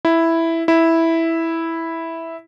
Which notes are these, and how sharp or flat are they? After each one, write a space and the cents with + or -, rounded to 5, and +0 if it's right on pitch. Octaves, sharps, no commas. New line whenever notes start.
E4 +0
E4 -5